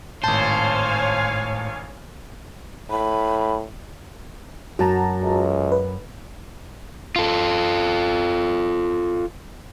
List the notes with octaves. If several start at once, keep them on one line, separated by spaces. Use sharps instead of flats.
G#1 A2 C5 C#5 F5 G#5 A5
A2 B5
F#2 F#4 A5 A#5
C#2
B4
F4 A4